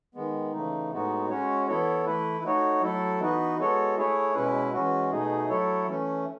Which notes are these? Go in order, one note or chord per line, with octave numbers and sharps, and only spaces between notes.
D#3 G#3 B3
C#3 E3 A3 D#4
A2 G#3 B3 D#4 F#4
G#3 C#4 F#4 C#5
E3 B3 E4 A4 C#5
E3 A3 E4 B4
A3 D#4 F#4 C#5
F#3 A3 E4 A4
E3 B3 D#4 F#4 B4
G#3 B3 F#4 A4 C#5
A3 E4 G#4 C#5
B2 G#3 C#4 E4 B4
E3 G#3 C#4 F#4
B2 A3 D#4 G#4
F#3 A3 E4 A4 C#5
E3 A3 C#4